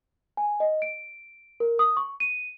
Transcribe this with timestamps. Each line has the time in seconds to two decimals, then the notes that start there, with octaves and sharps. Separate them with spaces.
0.37 G#5
0.60 D#5
0.82 D7
1.60 A#4
1.79 D#6
1.97 C#6
2.20 D#7